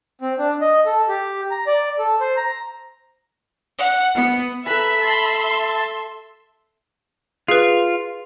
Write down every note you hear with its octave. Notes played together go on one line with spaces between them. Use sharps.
C4
D4
D#5
A4
G4
A#5
D5
A4
C5
A#5
F#5
B3
A4 B4 E5 A#5 B5
E5 A5 C6
F4 G#4 B4